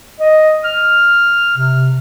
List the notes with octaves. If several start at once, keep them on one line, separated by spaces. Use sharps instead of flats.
D#5
F6
C3